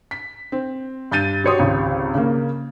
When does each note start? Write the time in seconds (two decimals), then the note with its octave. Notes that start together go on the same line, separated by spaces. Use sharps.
0.11 B6
0.52 C4
1.11 G2 G6 A6 D#7
1.44 F#4 G4 C#5 C6 D#6
1.59 G#1 C#2 C3
2.14 C#3 A#3